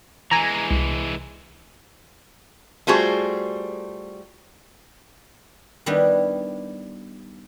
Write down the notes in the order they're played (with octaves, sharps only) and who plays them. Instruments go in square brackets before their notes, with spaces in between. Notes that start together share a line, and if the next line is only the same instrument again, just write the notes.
[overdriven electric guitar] E3 G#3 [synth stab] G#5 A#5
[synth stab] C2
[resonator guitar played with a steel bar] G3 A3 F4 F#4 G#4 C5
[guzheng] D#3 G3 B3 D4 E4